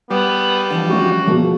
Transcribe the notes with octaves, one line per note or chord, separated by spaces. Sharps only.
G3 B3 B4
D3 E3 F3
F#3 A3 C#4 F#4
E1 B2 F3 A#3